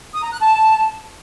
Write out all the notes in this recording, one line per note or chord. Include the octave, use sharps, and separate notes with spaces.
D#6
A#5
F#6
A5